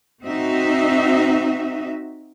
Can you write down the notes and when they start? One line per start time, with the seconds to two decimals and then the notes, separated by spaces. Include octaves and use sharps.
0.24 C4 D#4 F#4 E5